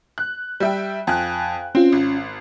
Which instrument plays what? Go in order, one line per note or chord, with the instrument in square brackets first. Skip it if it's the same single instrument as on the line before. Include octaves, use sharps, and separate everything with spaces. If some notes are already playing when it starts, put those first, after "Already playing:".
[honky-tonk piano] F#6
G3 E5 G5
[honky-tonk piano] F2 F#6 [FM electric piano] F5 G5 G#5
[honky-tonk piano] C4 [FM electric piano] C#4 F4
[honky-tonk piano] G#1